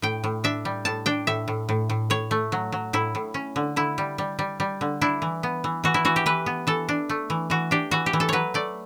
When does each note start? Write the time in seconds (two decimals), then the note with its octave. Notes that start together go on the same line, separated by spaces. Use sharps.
0.02 A2 G5
0.24 A2
0.44 D4 E5
0.65 G3
0.85 A2 A5
1.06 D4 G5
1.27 A2 E5
1.48 A2
1.69 A2
1.90 A2
2.10 A2 C#5
2.31 A3
2.52 F#3
2.72 F#3
2.93 A2 E4
3.15 A2
3.34 C#4
3.56 D3
3.76 D3 E4
3.98 G3
4.18 G3
4.39 G3
4.60 G3
4.81 D3
5.01 D4 E4
5.22 E3
5.43 B3
5.64 E3
5.84 E3 F#4
5.94 E4
6.05 E3 F#4
6.16 G4
6.26 E3 B4
6.46 B3
6.67 E3 A4
6.89 D4
7.09 A3
7.30 E3
7.50 E3 F#4
7.71 D4 G4
7.91 E3 F#4
8.06 G4
8.13 E3
8.20 A4
8.29 F#3 B4 C#5
8.54 A3 D5